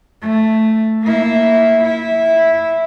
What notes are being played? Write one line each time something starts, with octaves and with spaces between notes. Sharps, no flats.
A3
A#3 E4
E4